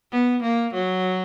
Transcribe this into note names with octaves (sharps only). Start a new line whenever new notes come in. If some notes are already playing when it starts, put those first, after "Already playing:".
B3
A#3
F#3